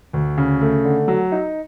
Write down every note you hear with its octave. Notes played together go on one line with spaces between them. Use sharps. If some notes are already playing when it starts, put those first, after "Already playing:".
D2
C#3
A3
D3
F#3
D#4